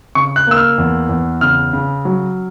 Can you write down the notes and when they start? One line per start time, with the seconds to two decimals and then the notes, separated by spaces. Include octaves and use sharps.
0.15 C#3 C#6
0.36 F#6
0.47 A#3 E6
0.57 F6
0.78 E2
1.09 E2
1.41 C#3 F6
1.73 C#3
2.05 F#3